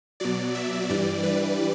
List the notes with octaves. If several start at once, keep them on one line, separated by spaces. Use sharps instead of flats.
B2 F#3 D5
E5
G2 E3 G3 D5
B4